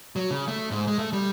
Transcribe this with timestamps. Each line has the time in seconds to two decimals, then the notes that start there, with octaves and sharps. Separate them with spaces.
0.16 F#3
0.31 C#3
0.48 A3
0.71 G#2
0.87 G#3
0.99 A3
1.13 G3